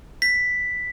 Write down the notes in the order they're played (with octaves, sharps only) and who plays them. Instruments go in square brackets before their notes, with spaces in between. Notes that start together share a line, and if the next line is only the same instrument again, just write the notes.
[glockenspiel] B6